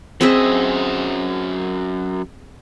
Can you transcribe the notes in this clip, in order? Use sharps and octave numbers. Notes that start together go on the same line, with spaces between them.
F#2 C4 G#4 D#5 E5